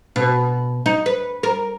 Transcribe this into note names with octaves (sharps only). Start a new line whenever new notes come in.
B2
D#4
B4
A#4